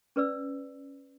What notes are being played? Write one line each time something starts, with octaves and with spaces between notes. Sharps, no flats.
C#4 B4 D5 E6